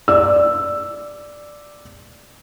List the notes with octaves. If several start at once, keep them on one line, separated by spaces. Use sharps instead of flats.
D5 E6